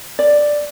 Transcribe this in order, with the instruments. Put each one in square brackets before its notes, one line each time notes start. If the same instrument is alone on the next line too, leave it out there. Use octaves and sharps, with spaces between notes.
[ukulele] D5